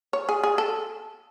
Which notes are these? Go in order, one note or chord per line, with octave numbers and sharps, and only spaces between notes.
C#5
G#4
G#4
A4